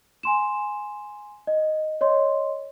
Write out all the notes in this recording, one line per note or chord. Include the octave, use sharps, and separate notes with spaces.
G#5 C6 E7
D#5
C#5 D#5 C6